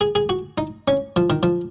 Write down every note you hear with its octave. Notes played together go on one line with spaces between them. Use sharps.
G#4
G#4
F#4
D#4
C#4
F3
D#3
F3